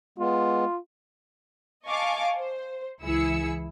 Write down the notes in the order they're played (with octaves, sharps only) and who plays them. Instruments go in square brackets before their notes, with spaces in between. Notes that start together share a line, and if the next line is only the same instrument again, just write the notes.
[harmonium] G#3 B3 [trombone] F4
[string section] D#5 F5 G#5 A5 C#6 D6
C5
C#2 E3 E4 G#4 E6 C#7